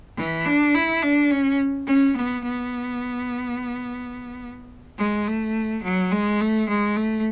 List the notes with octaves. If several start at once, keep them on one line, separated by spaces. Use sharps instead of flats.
E3
D4
E4
D4
C#4
C#4
B3
B3
G#3
A3
F#3
G#3
A3
G#3
A3